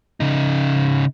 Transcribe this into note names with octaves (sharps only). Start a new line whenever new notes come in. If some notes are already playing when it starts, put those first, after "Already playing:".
C#3 D#4